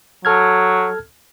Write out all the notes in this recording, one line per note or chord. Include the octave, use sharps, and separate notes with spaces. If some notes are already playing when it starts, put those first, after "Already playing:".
F#3 A4 F6 G#6